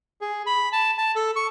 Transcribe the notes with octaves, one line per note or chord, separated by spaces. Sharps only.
G#4
B5
A5
A5
A4
C#6